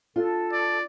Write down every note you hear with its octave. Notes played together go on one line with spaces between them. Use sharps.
D4 F4 A4
D5